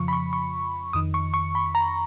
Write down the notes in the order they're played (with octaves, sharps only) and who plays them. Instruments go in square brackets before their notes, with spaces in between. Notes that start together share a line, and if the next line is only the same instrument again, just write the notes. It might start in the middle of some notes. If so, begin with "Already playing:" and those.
Already playing: [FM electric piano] F2 C#3 F3 C#6
B5
C#6
C#6
F2 D#3 D#6
C#6
C#6
B5
A#5